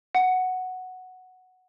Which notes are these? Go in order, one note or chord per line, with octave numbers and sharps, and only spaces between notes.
F#5